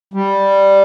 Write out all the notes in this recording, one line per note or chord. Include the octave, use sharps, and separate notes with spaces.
G3